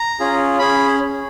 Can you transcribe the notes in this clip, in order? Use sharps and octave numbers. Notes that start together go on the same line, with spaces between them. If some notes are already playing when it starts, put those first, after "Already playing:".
Already playing: A#5
C#4 F4 G#4
C#4 G#4 B5